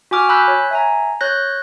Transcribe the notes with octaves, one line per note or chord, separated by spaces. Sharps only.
F#4 G#5 D6 F6
G#5 B5 E6 F#6 G6 B6
C#5
E5 G#5 A#5
C#5 F#6 G6 A#6